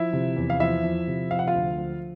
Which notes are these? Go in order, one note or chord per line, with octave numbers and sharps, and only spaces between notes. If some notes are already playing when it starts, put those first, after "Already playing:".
Already playing: F3 E4 E5
C3
E2
F5
F3 E4 E5
F3
C3
F3 F5
F#5
F4 F5
D2
F3